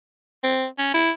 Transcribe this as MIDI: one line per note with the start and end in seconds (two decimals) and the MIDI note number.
0.44 0.67 60
0.78 0.93 61
0.94 1.11 64